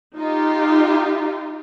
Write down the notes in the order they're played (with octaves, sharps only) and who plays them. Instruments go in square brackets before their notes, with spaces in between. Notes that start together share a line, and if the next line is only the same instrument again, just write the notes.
[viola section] D#4 F4 G4